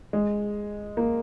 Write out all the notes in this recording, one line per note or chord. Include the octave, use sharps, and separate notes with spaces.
G#3
A#3